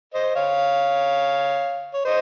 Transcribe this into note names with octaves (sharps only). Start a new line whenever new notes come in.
C5 D#5
C#5 F5
C#5
C5 D#5